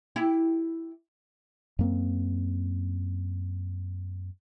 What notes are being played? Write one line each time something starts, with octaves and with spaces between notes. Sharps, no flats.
E4 G4
F#2 A#3 C4